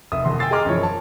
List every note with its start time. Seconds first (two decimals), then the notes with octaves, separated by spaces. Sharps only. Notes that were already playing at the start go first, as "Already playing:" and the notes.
0.12 F1 E5 D#6
0.24 E1 E2 C6
0.39 G5 G#5 E6 A6 C7
0.51 G#4 D#5 G#5 A#5 D6 F6
0.65 E1 F#2 E3 F3 C#5
0.83 A5